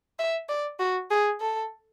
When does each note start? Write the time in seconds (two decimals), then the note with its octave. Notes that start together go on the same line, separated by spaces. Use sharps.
0.19 E5
0.49 D5
0.80 F#4
1.10 G#4
1.40 A4